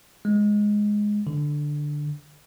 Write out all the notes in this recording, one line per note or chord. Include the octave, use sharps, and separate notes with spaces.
G#3
D3